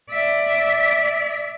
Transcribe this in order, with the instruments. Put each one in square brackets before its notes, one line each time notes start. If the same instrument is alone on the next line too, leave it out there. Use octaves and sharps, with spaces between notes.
[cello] D5 E5